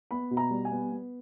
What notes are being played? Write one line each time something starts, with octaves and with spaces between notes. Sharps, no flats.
B3 B5
B2
A#5
G3
G#5
B3
B3